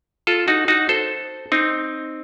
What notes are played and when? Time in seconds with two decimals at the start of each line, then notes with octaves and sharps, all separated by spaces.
0.27 F4 A4
0.48 D#4 F#4
0.68 D#4 F#4
0.89 A4 C5
1.52 C4 D#4